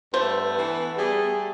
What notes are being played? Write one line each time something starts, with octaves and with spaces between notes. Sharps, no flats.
G2 A3 B3 C5
E3
G3 G#4